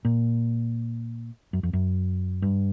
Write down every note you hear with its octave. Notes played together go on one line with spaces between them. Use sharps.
A#2
F#2
F2
F#2
G2